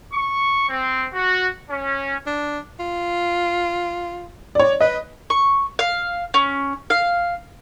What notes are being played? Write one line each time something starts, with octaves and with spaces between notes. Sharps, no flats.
C#6
C4
F#4
C#4
D4
F4
C#5 D5
B4 D#5
C#6
F5
C#4
F5